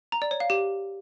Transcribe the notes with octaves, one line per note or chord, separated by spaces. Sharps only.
A#5
D5
C#5
F5
G4